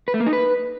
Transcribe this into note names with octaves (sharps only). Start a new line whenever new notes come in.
B4
A3
A#3
D#4
B4